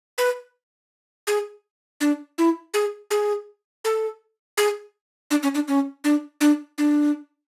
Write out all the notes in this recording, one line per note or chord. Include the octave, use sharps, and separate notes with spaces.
B4
G#4
D4
E4
G#4
G#4
A4
G#4
D4
C#4
D4
C#4
D4
D4
D4